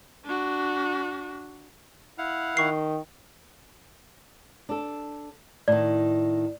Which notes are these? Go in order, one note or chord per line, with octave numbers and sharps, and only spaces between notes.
D4 F#4
E4 F5 F#5
D#3 C#6 C7
D4 A4
A2 D#3 D5